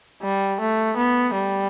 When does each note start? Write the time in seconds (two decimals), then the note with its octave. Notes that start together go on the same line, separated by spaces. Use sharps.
0.23 G3
0.60 A3
0.97 B3
1.35 G3